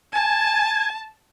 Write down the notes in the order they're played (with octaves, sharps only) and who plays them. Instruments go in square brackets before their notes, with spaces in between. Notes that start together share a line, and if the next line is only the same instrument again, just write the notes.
[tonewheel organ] G#5 [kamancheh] A5